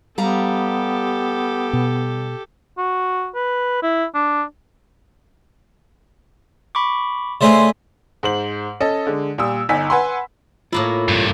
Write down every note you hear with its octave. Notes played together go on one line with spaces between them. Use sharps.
G3 B3 G4 A4 F5 A#5
B2
F#4
B4
E4
D4
B5 C#6 D6
C#3 A3 C4 D5 E5 G#5 C6
G#2 C5 F#7
C#4 A4 D#5
D3 G#3
A#2 G3 D#6 E6
G1 D#4 G#5 E6 B6
B4 F#5 G#5 B5 C6
A2 A#3 E4 F4 C#5
G2 C3